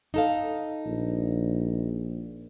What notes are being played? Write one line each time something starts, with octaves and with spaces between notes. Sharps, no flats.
D#4 A4 F5
A#1